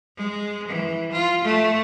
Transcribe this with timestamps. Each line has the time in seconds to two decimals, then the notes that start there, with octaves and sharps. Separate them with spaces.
0.17 G#3
0.68 E3
1.12 F4
1.44 A3